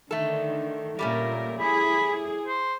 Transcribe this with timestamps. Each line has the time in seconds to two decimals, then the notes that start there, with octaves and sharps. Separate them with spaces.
0.11 D3 D#3 A3 A4
0.99 A#2 G3 A3 C#4 A#4
1.60 E4 G#4 B5
2.46 C5